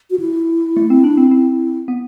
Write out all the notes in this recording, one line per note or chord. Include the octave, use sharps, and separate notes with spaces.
F#4
E4
A3
C4
D4
C4
C4
B3